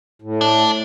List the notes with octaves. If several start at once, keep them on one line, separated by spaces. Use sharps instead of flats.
A2
D4